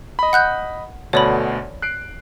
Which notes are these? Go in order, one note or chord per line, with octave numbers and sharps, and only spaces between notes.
D#5 B5
F#5 F#6 G6
D2 B2 D3 C#5 D5 B5
F#6 C7 D7